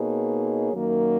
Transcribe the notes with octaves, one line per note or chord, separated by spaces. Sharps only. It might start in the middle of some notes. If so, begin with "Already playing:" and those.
Already playing: B2 A#3 D#4 G#4 C#5
F#2 D#3 F#3 A#3